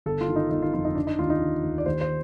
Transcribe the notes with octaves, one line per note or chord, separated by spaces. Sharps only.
G1 A4
F4
D#3
D#4
G1 D#4
F4
F2 F4
D#4
D3 D4
D#4
D#2 F4
D#4
D3
D#2
D5
D#2 C5
C5